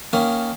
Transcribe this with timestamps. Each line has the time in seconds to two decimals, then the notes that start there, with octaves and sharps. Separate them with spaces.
0.13 D#3 A#3 C#4